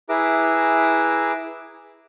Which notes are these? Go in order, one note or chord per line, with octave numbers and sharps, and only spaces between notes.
E4 G#4 B4 E5 A#5 D6